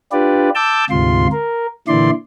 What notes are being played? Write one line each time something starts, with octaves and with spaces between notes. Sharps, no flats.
D4 F4 G4 B4 D5
A5 D6 E6 G6
D2 G#2 C3 F4 C6
A#4
A#2 D3 E3 E4 D5 C6